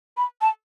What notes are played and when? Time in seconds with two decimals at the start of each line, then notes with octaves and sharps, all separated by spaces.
0.17 B5
0.41 A5